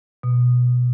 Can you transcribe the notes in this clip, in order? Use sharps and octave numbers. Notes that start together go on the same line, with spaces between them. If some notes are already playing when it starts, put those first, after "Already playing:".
B2